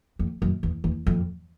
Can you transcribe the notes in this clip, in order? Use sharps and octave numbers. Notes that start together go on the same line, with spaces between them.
F2
F#2
E2
E2
F2